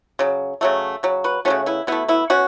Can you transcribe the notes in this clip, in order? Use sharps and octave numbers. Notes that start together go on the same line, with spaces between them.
C#3 F#3
C#3 F#3 A3
C#3 F#3
F#4 B4
F#3 A3 C#4 F#4
C#3
B3 E4
B2 A3 B3 E4
B3 E4
B2 C#4 F#4